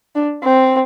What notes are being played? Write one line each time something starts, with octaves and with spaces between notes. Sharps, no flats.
D4
C4